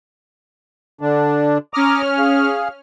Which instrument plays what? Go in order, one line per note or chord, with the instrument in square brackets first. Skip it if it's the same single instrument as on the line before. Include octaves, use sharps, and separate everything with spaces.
[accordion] D3 D4
[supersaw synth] C#4 F6 [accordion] A#5 D6 D#6
[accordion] G#4 F5